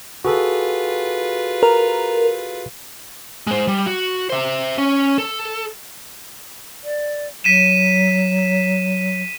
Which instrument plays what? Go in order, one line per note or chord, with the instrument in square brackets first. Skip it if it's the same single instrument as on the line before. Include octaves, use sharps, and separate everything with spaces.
[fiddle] F4 B4 [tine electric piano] F#4 G#4 A4
[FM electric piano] A#4
[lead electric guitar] G#3 C5
G3
F#4
C5 E5
C#4
A4
[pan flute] D5
[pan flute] F#3 [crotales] B6 D#7 E7